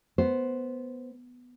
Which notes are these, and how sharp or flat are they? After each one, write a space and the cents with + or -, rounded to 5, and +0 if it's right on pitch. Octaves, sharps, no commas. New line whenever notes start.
B3 +0 C5 +0